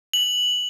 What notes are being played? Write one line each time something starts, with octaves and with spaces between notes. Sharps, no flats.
F#7